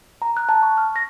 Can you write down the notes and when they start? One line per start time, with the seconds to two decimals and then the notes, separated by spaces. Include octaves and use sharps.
0.22 A#5
0.37 F#6
0.49 A5
0.63 C#6
0.78 F6
0.96 A#6